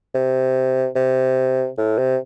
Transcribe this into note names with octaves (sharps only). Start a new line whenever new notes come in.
C3
C3
A2
C3